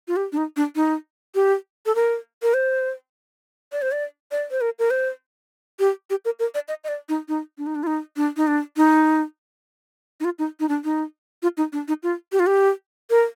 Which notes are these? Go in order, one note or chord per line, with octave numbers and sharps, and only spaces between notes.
F4
G4
D4
D#4
D4
D#4
G4
A4
A#4
A#4
C5
D5
C5
D5
D5
C5
A#4
A#4
C5
G4
G4
A#4
A#4
D5
D#5
D#5
D5
D#4
D#4
D4
D#4
D4
F4
D#4
D4
D#4
D4
D#4
D#4
F4
D#4
D#4
D4
D#4
F4
D#4
D4
D#4
F4
G4
F4
G4
A#4